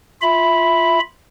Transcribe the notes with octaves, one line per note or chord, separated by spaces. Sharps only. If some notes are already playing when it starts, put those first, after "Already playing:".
F4 E5 B5